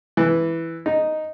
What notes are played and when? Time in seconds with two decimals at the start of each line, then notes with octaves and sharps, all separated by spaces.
0.17 E3
0.86 D#4